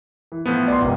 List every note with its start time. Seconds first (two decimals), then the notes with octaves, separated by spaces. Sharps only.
0.32 E3
0.46 A2 F3 B3
0.68 D5 C6
0.81 G#1 C3